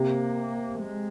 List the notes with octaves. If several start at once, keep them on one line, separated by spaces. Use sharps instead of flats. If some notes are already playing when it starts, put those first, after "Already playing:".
Already playing: C3 A#3
G#3